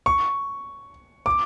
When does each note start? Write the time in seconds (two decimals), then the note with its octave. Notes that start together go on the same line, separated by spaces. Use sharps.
0.06 C#6
1.26 D6